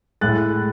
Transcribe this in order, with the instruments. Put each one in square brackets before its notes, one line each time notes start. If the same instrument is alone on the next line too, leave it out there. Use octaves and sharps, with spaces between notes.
[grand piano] A2 G#3 F#6 A6